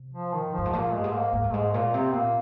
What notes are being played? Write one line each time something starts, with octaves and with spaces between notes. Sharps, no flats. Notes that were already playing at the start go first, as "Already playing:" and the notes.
Already playing: C3
F3
D#3
F2
F3
G2
G#2
A#2 A#3
G2 G#3
G#2
A#3
G#2 A#3
G2
G#2 G#3
A#2 A#3
C3 C4
A#2 A#3